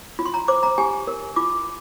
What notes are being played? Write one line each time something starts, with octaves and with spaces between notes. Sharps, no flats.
F4
C6
A#5
C5 D6
A#5
G4 G#5
A#4
F4 D6